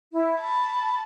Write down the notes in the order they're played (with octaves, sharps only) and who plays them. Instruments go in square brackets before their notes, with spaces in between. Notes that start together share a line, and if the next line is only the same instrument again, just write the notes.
[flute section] E4
[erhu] A5 [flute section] B5